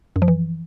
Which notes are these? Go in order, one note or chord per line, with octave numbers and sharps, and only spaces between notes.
F#2
F3
E3